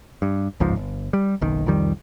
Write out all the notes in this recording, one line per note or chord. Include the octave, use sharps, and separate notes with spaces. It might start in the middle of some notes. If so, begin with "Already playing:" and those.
G2
G1 C#2 G#2 F3
G1
G3
F#1 B1 D#3
C2 F2 D#3 G3